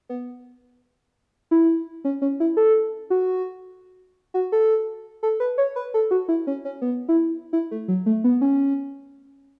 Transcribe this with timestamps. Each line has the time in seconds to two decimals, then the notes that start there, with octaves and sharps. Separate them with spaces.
0.09 B3
1.51 E4
2.04 C#4
2.22 C#4
2.40 E4
2.57 A4
3.10 F#4
4.34 F#4
4.52 A4
5.23 A4
5.40 B4
5.58 C#5
5.76 B4
5.94 A4
6.11 F#4
6.28 E4
6.47 C#4
6.65 C#4
6.82 B3
7.09 E4
7.53 E4
7.71 A3
7.88 F#3
8.06 A3
8.24 B3
8.41 C#4